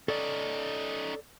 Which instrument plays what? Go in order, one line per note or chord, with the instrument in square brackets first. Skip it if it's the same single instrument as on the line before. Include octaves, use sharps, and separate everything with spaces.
[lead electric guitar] C#4 D#4 [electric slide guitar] A4 D5